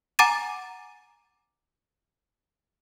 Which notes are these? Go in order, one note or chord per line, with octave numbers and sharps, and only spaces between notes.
F#5 G#5 A#5 D6 A6 D#7